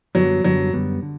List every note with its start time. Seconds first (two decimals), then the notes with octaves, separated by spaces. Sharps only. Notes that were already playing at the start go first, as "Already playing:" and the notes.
0.15 F#2 D3 F#3 G3 B3
0.44 F#2 D3 F#3 G3 B3
0.73 F#2 D3 G3 B3
1.02 D3